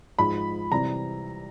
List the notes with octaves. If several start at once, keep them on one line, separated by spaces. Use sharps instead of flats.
G#2 F3 G#3 B5
C3 E3 G3 A#5